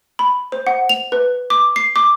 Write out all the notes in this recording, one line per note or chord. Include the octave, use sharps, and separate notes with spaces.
B5
C5
F#5
F7
B4
D6
C7
D6